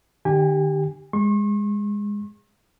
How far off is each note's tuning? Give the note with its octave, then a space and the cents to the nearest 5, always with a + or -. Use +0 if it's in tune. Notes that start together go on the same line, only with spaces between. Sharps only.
D3 +45 G4 +0 G#5 -30
G#3 -15 C#6 -45